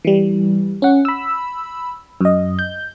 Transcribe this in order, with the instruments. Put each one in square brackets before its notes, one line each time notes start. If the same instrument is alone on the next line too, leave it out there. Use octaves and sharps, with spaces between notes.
[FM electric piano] E3 G3
C#4 F#5
B5 E6
F#2 D#5
G6